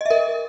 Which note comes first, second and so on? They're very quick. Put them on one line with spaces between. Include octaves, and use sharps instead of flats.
D#5 E5 A#4